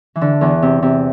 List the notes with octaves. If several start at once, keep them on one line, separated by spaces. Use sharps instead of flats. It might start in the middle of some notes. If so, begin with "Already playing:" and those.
E3
D3
E2 E3
C3
C3